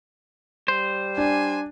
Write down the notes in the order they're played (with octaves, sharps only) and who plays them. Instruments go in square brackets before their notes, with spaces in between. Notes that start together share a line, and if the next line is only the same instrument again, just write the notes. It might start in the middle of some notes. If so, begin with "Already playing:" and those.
[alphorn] G3 [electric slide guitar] C5
[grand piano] D4 [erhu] G#5